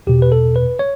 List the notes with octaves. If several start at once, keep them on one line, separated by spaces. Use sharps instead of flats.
E2 B2 G4
B4
A4
B4
C#5